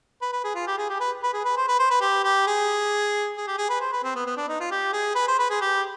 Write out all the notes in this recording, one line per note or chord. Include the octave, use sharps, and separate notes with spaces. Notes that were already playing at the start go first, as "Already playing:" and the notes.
B4
B4
G#4
F4
G4
G#4
G4
B4
B4
G#4
B4
C5
B4
C5
B4
G4
G4
G#4
G#4
G4
G#4
B4
C5
B4
C4
B3
B3
D4
D#4
F4
G4
G#4
B4
C5
B4
G#4
G4